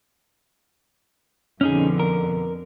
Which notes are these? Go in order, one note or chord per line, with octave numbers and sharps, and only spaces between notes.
F2 B2 D3 C#4 D#4 G#4
A#4